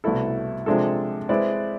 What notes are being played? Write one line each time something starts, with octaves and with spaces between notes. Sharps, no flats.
C2 B2 A3 E4 A4
C3 F3 G#3 D4 A4
G#3 C4 E4 B4 D5